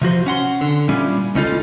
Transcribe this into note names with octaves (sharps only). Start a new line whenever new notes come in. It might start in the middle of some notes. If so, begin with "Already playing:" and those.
C3 F3 F#4 C5
C#4 F#5 C6
D3
A#2 G3 C#4 E4 F4
C#2 C#4 D#4 F4 A4